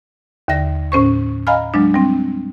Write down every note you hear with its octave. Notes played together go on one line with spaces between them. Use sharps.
D#2 D3 E5 A#6
A2 C#4 C5 C#6
D#5 F5 G#5 A#5 B5 F6
F#3 G#3 D4
G3 C4